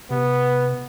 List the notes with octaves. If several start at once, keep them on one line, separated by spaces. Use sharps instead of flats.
C3 B3